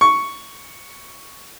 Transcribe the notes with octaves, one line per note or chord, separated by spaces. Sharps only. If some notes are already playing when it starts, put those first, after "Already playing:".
C#6